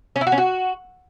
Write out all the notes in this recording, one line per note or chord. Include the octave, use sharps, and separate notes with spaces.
C#4
E4
F#4
C#4
F#4